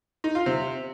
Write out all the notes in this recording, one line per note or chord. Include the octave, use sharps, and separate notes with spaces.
D#4
F4
C3